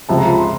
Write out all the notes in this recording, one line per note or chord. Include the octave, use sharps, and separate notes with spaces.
C#2 C3 F3 A5
A#5
B5
C6